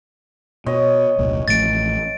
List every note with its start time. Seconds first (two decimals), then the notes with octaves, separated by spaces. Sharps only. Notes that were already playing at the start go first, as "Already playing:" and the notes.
0.66 B2 C#5 D#5
1.18 E1 C2 A#2
1.48 A1 F3 A3 A6 D7